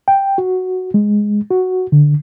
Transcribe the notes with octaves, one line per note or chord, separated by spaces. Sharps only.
G5
F#4
G#3
F#4
D3